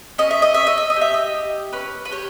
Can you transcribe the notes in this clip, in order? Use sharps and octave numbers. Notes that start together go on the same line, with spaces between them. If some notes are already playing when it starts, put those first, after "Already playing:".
C#4 D#5
E5
D#5
C#4 E5
D#5
E5
D#5
G4
E5
D#5
G4
C#4 B4
B4
G4 C#5